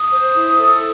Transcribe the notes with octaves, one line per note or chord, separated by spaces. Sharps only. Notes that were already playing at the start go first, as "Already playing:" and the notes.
Already playing: D#6
C5
E4
A4